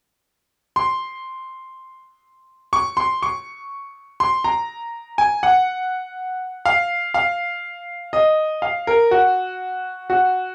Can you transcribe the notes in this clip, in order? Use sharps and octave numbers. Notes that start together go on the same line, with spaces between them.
C6
C#6
C6
C#6
C6
A#5
G#5
F#5
F5
F5
D#5
F5
A#4
F#4
F#4